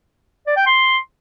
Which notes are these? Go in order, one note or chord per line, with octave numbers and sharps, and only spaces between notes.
D5
G5
C6